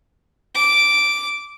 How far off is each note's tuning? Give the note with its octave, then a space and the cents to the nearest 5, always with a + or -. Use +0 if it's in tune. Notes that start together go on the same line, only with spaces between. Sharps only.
D6 -5